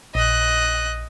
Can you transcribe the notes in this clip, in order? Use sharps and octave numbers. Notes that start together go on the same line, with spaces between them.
A#1 D#5 F#6